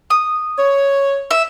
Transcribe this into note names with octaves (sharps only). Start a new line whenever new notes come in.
D#6
C#5
E5